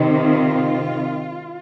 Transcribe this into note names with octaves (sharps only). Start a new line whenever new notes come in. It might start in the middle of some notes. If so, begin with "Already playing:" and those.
Already playing: C3 D#3 C4 D#4
F4